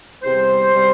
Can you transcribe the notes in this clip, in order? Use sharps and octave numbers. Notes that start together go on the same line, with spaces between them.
E2 C3 G3 C5
C3 G3